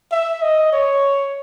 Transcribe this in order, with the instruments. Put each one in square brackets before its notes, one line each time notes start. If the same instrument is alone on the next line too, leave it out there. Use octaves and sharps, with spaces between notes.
[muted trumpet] E5
D#5
C#5